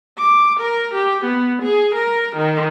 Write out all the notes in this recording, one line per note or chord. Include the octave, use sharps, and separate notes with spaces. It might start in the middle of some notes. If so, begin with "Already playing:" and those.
D6
A#4
G4
B3
G#4
A#4
D#3